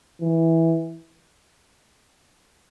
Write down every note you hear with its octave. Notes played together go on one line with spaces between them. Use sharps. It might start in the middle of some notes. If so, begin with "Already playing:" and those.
E3